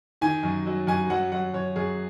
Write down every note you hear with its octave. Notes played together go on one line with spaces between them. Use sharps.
D#3 G#5
F#2
F#3
F#2 G#5
F#3 F#5
F#3 F#5
F#2 C#5
F#2 G#4